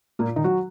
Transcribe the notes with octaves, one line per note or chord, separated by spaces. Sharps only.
A#2 A#3
D#3 D#4
F#3 F#4